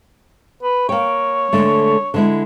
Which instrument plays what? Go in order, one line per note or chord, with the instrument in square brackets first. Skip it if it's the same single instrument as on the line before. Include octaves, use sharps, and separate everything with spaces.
[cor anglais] B4
[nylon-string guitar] A#3 G5 [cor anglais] C#5
[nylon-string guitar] D3 G#3 A3
D3 G#3 E4